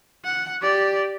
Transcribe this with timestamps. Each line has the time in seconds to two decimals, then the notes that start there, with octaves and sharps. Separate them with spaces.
0.25 F#5
0.62 G4 D5